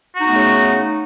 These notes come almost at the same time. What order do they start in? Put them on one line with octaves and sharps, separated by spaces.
F#4 D#4 B3 A3 C#3